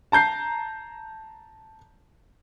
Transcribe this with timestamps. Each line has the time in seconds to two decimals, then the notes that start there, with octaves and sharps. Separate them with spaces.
0.12 A5 A#5 G6 C7